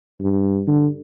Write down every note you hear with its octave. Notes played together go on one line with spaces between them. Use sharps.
G2
D3